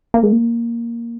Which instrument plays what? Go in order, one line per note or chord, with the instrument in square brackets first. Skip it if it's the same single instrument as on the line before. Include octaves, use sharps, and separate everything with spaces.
[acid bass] A#3
G#3
A#3